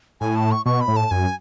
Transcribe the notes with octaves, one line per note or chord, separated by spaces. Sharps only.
A2 G#5
A5
C#6
B2 C#6
B5
A2
A5
F#2 G#5